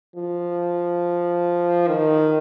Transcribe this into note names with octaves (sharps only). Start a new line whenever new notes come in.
F3
D#3